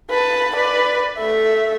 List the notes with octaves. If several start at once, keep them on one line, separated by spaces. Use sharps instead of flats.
B4 A5
B4 D5
A3 E5